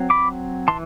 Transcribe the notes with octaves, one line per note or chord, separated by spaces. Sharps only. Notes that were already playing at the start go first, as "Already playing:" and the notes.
Already playing: F#3 C4
B5 D6
E3 A5 C6